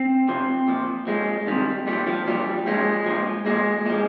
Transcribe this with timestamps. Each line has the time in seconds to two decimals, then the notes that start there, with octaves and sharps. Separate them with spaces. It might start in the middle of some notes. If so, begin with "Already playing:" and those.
Already playing: C4
0.28 C3 F3
0.68 A#2 F3
1.07 A#2 F3 G#3
1.47 C3 D#3 G3
1.87 A#2 F3 G3
2.07 F3
2.27 A#2 F3 G3
2.67 A#2 F3 G#3
3.06 A#2 F3
3.46 A#2 F3 G#3
3.86 A#2 F3 G#3